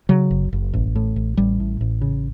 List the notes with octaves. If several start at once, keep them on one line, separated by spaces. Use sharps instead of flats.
C#3 F#3
F#1
F#1
A1
A2
A1
A1 G3
A2
A1
C#3